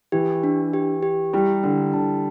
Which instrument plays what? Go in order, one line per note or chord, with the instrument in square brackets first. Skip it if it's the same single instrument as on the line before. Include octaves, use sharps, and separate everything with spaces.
[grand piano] E3 [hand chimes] G4
[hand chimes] D4
G4
G4
[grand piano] G3 [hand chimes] E4
[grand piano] D3 [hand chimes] E4
[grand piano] D3 [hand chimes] A5